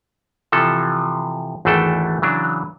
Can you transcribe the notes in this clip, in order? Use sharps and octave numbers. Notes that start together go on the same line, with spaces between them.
C3 E3 F3 A4
G#1 E2 E3 A3 A4 G5
C#3 E3 F#3 D4